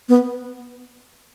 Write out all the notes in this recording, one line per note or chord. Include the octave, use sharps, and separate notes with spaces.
B3